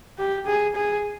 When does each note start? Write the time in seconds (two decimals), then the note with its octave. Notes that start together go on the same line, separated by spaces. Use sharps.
0.19 G4
0.47 G#4
0.76 G#4